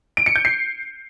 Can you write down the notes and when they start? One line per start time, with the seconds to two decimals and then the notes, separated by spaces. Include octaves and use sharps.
0.17 D7
0.26 C#7
0.36 G6
0.45 C7